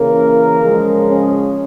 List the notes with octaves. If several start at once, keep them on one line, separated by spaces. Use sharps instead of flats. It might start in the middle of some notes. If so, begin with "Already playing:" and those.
Already playing: C#3 E3 A#3 A#4
C#3 F3 G#3
C#4